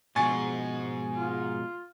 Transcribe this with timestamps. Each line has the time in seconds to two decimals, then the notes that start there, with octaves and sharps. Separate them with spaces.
0.16 G#2 B2 F3 G#3 G#5 C#6 A6
1.16 F4